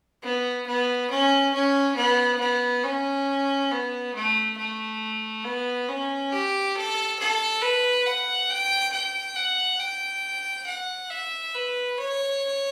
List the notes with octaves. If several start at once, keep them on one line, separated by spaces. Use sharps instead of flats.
B3
B3
C#4
C#4
B3
B3
C#4
B3
A3
A3
B3
C#4
G4
A4
A4
B4
F#5
G5
G5
F#5
G5
F#5
E5
B4
C#5